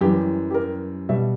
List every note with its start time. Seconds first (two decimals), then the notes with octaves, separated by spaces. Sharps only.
0.01 F#2 E3 G3 G4
0.51 G4
0.54 A#4
1.09 B2 G3 E5